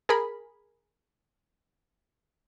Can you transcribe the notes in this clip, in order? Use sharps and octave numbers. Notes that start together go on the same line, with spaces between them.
G#4 A#4 B5